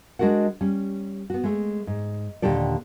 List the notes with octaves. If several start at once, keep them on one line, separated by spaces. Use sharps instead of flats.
G#3 D4 F#4 A#4 F#5
G3 C#4
B3 F#4
G#3 A3
G#2
D#2 A#2 D3 G4 A4 D5